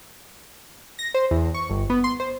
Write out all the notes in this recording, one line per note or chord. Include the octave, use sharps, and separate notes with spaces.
A#6
C5
E2
C#6
G1
B3
C6
C5